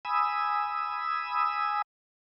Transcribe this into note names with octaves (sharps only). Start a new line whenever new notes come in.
G#5 B5 D#6 E6